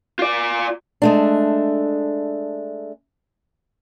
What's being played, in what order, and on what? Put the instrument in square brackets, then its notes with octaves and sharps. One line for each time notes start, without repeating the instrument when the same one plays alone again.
[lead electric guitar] F4 D5
[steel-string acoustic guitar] G#3 A3 D4